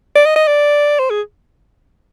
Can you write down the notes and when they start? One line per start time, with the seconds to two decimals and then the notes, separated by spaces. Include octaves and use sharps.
0.16 D5
0.26 D#5
0.36 D#5
0.47 D5
0.99 C5
1.10 G#4